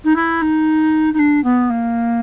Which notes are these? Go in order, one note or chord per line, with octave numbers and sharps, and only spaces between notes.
D#4
E4
D#4
D#4
D4
B3
A#3